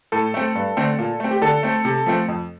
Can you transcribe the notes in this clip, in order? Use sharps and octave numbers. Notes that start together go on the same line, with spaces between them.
A2 A4
A3 C4
G2
D3 A3 C4
A#2
A3 C4
G4
D3 A4
A3 C4
C3
F3 A3 C4
F2